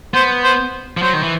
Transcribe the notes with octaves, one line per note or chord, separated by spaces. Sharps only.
B3 C5
C5
F3
F#3 C5
D#3
E3